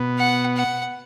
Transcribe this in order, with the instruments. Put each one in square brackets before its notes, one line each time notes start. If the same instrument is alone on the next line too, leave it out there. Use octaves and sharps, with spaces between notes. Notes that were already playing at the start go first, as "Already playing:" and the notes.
Already playing: [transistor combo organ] B2 B3
[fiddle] F#5
F#5